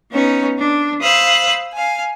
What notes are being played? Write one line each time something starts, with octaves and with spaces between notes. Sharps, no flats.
B3 C#4 D#4
D4
C5 F5 B5 D#6 E6 F#6
F5 G#5